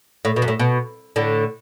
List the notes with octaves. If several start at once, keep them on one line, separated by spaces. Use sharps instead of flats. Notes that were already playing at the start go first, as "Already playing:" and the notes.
A2
B2
F#2
A2
B2
A2 D3